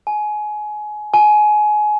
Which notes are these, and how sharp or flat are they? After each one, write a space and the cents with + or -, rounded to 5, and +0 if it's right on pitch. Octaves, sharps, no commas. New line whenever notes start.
G#5 +25
G#5 +25